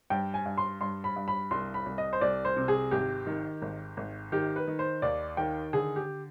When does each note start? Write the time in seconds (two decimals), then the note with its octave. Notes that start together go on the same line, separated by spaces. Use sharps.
0.10 G2 G5
0.34 G#5
0.46 G2
0.58 C6
0.81 G2 C6
1.04 B5
1.16 G2
1.28 B5
1.51 C2 C6
1.74 B5
1.86 C2
1.98 D#5
2.13 C5
2.21 C2 D5
2.45 C5
2.57 C3
2.68 G#4
2.91 G#1 G4
3.27 D#3
3.62 G#1
3.97 G#1
4.32 D#3 G4
4.56 B4
4.67 D#3
4.79 C5
5.02 D#2 D5
5.37 D#3 G5
5.73 D3 G#4
5.96 G4